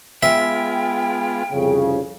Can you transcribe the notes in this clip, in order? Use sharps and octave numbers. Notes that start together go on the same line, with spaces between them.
G#3 B3 F4 E5 G5
C2 F2 C#3